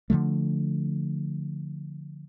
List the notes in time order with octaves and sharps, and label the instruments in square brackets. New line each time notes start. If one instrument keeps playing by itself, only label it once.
[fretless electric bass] D3 E3 F3 A3